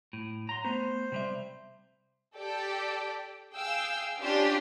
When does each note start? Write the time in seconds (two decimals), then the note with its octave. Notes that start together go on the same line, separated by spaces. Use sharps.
0.13 A2
0.49 F#3 A#5 C6
0.64 A3 B3 C5
1.12 C3 G3 E5
2.36 G4 A4 D5 G5
3.54 G#4 F5 G5 E6
4.21 C#4 D4 F4 G4 D5 C6